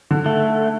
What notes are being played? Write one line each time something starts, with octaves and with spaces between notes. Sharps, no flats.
D3
A3